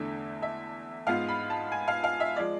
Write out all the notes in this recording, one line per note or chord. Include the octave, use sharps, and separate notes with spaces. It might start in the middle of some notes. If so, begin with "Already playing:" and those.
Already playing: E2 D3 A3 D4 E5
E5
G#2 G#3 B3 F4 F5
B5
A5
G#5
F5
F5
E5
F3 G#3 D5